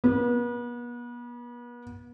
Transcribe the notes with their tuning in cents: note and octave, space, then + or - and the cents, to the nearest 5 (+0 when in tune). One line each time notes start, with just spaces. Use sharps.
B3 -40